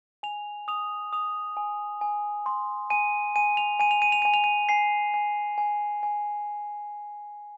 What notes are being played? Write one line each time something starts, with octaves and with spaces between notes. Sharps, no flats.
G#5 F7
D#6 F7
D#6 F7
G#5
G#5
C6
G#5 D#7
G#5 D#7
F7
G#5 D#7
F7
D#7
F7
G#5 D#7
F7
D#7
G#5 C7
G#5
G#5
G#5